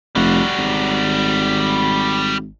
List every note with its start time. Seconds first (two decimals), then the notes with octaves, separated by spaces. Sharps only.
0.15 F1 G3 F#4
0.58 G#1